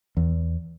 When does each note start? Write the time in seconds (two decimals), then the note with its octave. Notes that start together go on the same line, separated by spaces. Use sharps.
0.17 E2